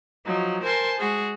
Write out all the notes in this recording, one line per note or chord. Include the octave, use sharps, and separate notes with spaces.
F3 F#3 D#4
A#4 C5 G#5 A5 C6
G#3 F#4 G#4